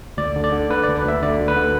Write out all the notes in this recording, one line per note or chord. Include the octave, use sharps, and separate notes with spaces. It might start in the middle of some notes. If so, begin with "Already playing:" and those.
D2 D5
D3
D5
D3
D3 B4
D2 D5
B4
D2 E5
D3 D5
D2
B4
D3